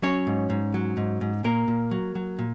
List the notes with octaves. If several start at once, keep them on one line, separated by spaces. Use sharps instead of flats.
F#3 C#4 C#5
G#2
G#2
F#3
G#2
G#2
A#2 A#3 A#4
A#2
F#3
F#3
A#2